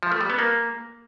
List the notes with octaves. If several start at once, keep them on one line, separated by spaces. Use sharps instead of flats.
F3
A3
G3
B3
A#3